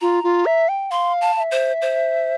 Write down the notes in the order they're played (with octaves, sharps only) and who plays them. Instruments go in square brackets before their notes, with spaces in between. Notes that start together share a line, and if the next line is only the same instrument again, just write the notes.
[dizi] F4 [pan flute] A#5
[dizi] F4
E5
G5
[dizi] F5 [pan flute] C6
[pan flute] A5
[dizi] F5
E5
[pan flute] C5
C5